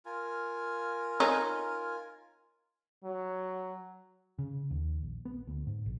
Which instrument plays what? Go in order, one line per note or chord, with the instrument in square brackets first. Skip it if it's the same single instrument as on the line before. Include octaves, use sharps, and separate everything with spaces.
[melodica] F4 A#4 G#5
[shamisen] C#4 D#4
[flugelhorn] F#3
[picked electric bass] C#3
D#2
A#1
B3
D2
G#2
A#1